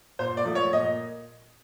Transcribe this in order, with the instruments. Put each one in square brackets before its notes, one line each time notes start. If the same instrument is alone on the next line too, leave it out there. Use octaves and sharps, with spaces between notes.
[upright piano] A#2 C5
D5
F3 A3
C#5
A#2 D#5